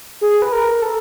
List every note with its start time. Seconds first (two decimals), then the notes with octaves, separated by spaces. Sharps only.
0.21 G#4
0.42 B4
0.52 A#4
0.82 A4